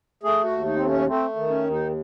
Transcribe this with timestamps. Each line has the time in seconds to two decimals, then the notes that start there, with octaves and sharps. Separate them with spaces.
0.23 A3 G#4
0.44 F#4
0.51 D#2
0.66 D#4
0.77 A3 C4
0.86 C#4
1.07 A3 C4
1.36 D#3
1.49 C#4
1.64 D#2
1.70 D#4